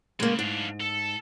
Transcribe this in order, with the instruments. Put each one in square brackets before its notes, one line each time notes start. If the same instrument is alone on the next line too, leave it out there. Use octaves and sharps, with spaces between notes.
[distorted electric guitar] C#3 [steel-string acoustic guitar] G#3 A#3
[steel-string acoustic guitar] G#2 [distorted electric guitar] D4 F5
[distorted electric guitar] A4